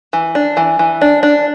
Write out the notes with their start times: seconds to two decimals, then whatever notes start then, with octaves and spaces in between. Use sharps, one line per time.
0.13 E3
0.35 D4
0.57 E3
0.79 E3
1.01 D4
1.23 D4